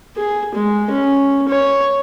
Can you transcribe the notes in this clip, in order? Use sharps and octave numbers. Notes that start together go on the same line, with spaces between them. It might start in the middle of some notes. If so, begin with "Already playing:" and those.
G#4
G#3
C#4
C#5